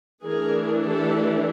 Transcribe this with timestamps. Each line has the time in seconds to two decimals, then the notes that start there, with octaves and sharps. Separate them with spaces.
0.24 E3 A3 D4 G#4 A#4
0.84 G4 A4